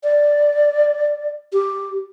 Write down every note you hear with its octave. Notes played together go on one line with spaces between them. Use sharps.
D5
G4